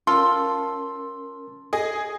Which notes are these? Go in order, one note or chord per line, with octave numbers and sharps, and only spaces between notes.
C#4 F4 A4 A#4 C6
G#4 D#5